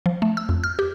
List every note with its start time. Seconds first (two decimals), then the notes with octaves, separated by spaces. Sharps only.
0.06 F3
0.22 A3
0.37 E6
0.49 F2
0.64 F6
0.79 G4